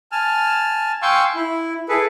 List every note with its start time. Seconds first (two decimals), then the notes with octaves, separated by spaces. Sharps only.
0.12 G#5 A5 F6
1.02 F5 G5 G#5 C6 C#6 E6
1.35 E4
1.89 E4 G#4 A4 B4